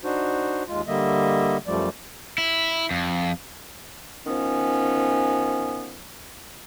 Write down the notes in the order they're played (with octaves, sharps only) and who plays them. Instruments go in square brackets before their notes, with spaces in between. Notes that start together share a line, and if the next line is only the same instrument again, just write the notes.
[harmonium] D4 D#4 F#4 C5
D#2 G#3 F4
D3 G3 A#3 D#5 E5
F#2 F3 G3 A3 D5
[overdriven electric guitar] E4
F2
[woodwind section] D#3 F3 B3 C#4